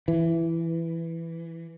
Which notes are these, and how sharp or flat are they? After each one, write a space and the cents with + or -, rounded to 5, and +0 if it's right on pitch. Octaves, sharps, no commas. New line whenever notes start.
E3 +10